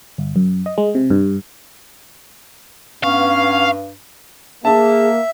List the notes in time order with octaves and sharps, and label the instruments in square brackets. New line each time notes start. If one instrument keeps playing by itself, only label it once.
[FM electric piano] G1
F#2
D#5
G#3
C3
G2
[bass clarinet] G2 [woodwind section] B3 C#4 [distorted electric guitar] F5 [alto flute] C#6
[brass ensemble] A#3 [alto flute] G#4 [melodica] E5 [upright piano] A5